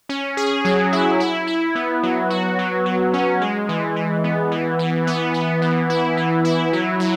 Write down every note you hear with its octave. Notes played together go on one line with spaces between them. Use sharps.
C#4
G#4
F#3
E4
E4
E4
B3
F#3
F#4
F#3
F#3
C#4
G#3
E3
E3
B3
E3
E3
B3
B3
E3
E4
E3
E4
F#3
F#3